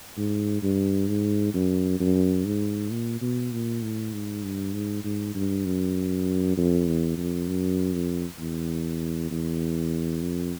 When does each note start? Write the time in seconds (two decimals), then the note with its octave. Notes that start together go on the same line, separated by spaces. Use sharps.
0.17 G#2
0.62 G2
1.08 G#2
1.54 F#2
1.99 F#2
2.45 G#2
2.91 A#2
3.21 B2
3.52 A#2
3.82 A2
4.13 G#2
4.43 G2
4.74 G#2
5.04 G#2
5.35 G2
5.65 F#2
6.57 F2
6.87 E2
7.17 F2
7.48 F#2
7.93 F2
8.39 E2
9.31 E2
10.22 F2